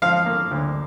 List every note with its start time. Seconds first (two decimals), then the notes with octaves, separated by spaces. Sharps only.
0.02 F3 F5
0.26 A#3
0.51 D2